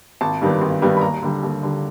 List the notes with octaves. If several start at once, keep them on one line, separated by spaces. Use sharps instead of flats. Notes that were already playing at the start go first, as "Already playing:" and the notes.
G#1 A5
G2 D#3 G3 B3
G#1
G2 D#3 G3 B3
B5
D#2 A#5
D3 G3
D#2
D3 G3